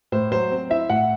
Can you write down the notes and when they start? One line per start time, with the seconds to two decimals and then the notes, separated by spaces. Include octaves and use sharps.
0.12 A2 C5
0.32 F#3 C5
0.51 C4
0.70 E4 E5
0.90 A2 F#5